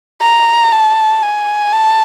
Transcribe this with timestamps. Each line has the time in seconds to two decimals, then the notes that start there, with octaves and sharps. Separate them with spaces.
0.21 A#5
0.72 A5
1.22 G#5
1.72 A5